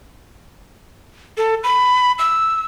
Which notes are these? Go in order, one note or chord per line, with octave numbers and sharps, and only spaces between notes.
A4
B5
E6